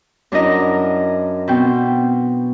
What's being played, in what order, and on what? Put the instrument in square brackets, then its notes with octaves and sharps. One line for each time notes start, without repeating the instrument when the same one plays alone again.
[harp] F#2 D4 E4 A#4 D#5 A#5
B2 C4 G5